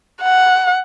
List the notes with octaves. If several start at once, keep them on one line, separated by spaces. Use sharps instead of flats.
F#5